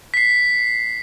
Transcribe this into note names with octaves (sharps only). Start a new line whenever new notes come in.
B6 C7